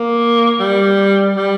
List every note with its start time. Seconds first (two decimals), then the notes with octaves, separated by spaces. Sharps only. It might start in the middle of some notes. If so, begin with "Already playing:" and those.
Already playing: A#3
0.60 G3
1.36 G3